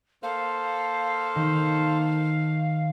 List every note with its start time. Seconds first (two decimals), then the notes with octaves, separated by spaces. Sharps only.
0.23 A#3 A4 C5 F5
1.36 D#3